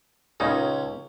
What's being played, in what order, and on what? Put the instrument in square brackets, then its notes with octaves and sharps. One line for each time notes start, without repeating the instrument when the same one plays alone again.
[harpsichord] C#2 C#4 [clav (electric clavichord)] A#2 C#3 D#4